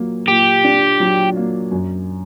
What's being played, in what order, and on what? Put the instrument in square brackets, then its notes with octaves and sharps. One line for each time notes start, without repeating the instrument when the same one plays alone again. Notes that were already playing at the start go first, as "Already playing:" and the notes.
Already playing: [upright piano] A#2 F#3 A#3
[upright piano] A#2 [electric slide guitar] G4
[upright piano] D4
F#3
A#3
F#2